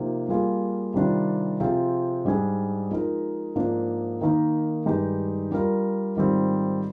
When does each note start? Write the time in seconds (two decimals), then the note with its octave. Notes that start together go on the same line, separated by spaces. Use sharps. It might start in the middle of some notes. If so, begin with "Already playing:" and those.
Already playing: C3 F3 A#3 D#4
0.29 G3 A#3 F4 G#4
0.94 C3 D#3 G3 D4 F4
1.60 C3 F3 C4 F4 G#4
2.25 G#2 G3 D4 G#4
2.90 F3 G#3 D#4 A#4
3.56 G#2 F3 A#3 D4
4.21 D#3 A#3 D#4 A#4
4.86 G2 D#3 G#3 D#4 G4
5.52 G3 D4 F4 A#4
6.16 G#2 D#3 G3 C4 F4